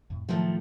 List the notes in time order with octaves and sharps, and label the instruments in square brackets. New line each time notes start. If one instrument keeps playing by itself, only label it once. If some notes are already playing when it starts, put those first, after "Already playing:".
[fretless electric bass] F2 A2
[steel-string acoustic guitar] A2 F3 A3 [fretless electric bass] D#3 F#3